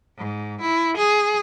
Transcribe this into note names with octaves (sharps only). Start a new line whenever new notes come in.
G#2
E4
G#4